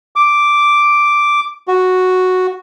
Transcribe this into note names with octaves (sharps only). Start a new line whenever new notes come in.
D6
F#4